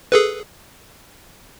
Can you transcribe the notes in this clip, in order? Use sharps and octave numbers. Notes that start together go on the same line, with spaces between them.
G#4 A4 B4